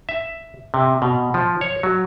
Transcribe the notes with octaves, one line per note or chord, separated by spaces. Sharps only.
E5
C3
B2
F3
C#5
F#3